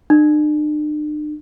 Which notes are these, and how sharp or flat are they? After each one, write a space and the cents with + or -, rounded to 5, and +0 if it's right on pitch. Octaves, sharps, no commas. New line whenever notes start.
D4 +45